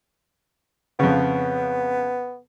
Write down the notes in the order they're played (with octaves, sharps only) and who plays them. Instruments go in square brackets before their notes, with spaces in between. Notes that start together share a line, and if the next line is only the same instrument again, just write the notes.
[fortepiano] F2 C#3 [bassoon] B3